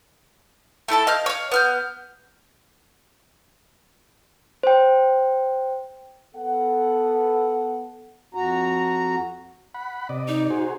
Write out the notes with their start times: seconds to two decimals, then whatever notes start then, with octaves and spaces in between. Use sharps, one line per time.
0.88 A3 E4 A4 A5
1.07 D#5 F5 F6 G6
1.26 C#5 F5
1.52 B3 F6 G6
4.63 C5 G5
6.35 B3 A4 F#5
8.34 F2 F#4 A#5
9.74 F#5 B5
10.09 C3 D5 D#5
10.28 D#4
10.50 F#4 G#4 C5